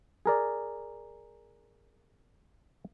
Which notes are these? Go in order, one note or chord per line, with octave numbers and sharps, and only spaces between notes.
G#4 A#4 D5